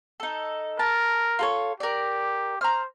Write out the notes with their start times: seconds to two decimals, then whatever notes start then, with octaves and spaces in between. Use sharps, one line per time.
0.20 D#4 A4
0.79 A#4 A5
1.39 F4 A4 C#5
1.80 G4 A#4 D5
2.61 C5 A#5 F6